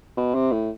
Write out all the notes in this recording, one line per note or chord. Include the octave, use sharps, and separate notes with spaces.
B2
C3
A2